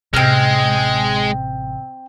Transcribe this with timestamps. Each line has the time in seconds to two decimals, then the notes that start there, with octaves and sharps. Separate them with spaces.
0.14 A1 C3 G#3 C4 F6